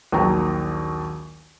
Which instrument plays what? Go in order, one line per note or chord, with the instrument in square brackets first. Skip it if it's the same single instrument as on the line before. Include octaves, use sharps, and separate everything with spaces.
[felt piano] A#1 D#2 F#3 G5 A#5